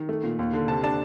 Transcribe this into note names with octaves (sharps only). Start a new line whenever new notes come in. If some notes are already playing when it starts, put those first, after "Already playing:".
Already playing: D#3
A3
A#2
D#2
D3
C3 A5
D4 A5